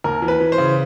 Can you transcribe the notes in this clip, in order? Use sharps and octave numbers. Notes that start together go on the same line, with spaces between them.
D#2 A#4
E3
B4
E3
C5
C#3